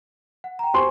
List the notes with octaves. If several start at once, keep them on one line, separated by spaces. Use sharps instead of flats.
F#5
G5 A#5
F#4 G4 C5 G#5 C6 C#6